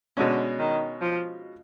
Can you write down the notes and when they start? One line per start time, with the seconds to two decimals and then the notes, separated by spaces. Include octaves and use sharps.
0.17 B2 D3 G#3 C#4
0.59 D#3
1.01 F3